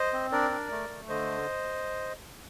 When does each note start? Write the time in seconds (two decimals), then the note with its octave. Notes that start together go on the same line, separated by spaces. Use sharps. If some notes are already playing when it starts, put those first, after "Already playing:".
Already playing: C5 D#5
0.13 C4
0.32 D4 A#4 D5
0.51 D4
0.71 A3
0.89 A3
1.09 D3 C5 D#5